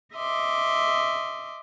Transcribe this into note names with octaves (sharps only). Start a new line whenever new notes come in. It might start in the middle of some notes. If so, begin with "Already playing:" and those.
D#5 E5 C6 D6